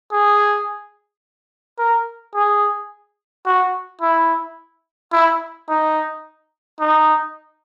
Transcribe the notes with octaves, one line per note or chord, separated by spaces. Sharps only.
G#4
A#4
G#4
F#4
E4
E4
D#4
D#4